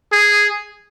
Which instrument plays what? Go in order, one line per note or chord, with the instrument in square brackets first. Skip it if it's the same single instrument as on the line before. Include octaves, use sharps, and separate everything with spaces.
[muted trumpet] G#4